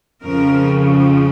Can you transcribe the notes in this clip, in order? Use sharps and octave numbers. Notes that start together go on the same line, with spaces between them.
F2 C#3 F3 A#4